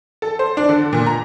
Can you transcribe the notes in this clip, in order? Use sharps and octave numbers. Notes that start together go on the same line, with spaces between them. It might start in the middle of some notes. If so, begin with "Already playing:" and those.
A4
C5
D4
D3
A#2
A#5